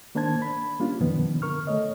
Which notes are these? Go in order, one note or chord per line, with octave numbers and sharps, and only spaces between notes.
D#3 A#3 D4 C5 A5 G#6
B5
G3 A#3 C#4 D4 F4
F#2 B2 D#3 F3 B3
D3 A#4 C#6 F6
A3 C#5 D#5